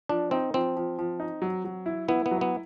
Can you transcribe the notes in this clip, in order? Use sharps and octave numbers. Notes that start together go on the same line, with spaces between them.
F3 D4
C4 D#4
F3 C4
F3
F3
D#4
F#3
F#3
E4
B3 E4
B3
F#3
B3